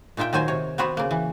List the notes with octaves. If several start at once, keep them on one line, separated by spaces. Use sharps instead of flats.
A#2 D#4 F4 E5 G5
D#3 F#3 C5 G#5
C3 C#5
B3 C4 F#4 B4
C#3 A#3
E3